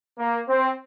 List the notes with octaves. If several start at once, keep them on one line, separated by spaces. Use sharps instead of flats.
A#3
C4